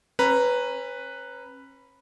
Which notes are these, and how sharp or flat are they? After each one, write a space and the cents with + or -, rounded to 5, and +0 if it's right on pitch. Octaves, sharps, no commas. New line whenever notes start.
C#4 -35 B4 +0 A#5 +0